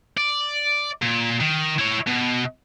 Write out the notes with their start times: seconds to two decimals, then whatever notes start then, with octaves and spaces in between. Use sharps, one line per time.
0.18 D5
1.02 A#2
1.40 D#3
1.79 E4 C#5
2.07 B2